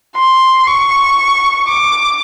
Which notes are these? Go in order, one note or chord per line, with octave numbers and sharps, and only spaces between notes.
C6
C#6
D6